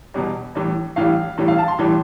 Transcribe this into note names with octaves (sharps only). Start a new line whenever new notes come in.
E2 B2 G3
A2 E3 G3
A2 E3 G3 F5
A2 E3 G3
F5
A5
C6
A2 E3 G3